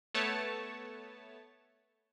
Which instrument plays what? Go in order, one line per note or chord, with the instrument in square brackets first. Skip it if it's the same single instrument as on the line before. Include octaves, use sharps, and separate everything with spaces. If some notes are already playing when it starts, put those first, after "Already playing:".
[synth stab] A3 B3 C#5 A5